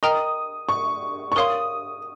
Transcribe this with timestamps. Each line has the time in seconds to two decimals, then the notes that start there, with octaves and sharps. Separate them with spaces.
0.03 A#4 D#5 G5 A#5 D#6 F6
0.69 C#6
1.32 C#6
1.36 A#4 C#5 F5 C6 D#6